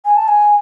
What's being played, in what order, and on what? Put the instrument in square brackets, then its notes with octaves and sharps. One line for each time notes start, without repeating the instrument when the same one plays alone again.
[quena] G#5
A5
G#5